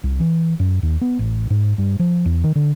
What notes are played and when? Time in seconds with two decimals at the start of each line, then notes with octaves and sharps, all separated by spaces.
0.04 C2
0.20 E3
0.59 F#2
0.83 D#2
1.01 B3
1.19 A1
1.50 G#2
1.78 G2
2.00 F3
2.25 E2
2.44 D#3
2.56 D3